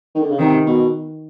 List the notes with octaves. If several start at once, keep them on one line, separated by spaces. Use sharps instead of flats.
D#3
D3
C#3
C3 D#3
B2